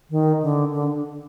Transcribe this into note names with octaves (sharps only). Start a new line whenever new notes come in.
D#3
D3
D3